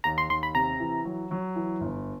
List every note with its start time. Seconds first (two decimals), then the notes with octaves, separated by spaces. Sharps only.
0.04 D#2 A#5
0.18 C6
0.29 D#2 C6
0.43 B5
0.55 C3 A#5
0.80 E3
1.05 F#3
1.31 F#3
1.56 E3
1.81 G1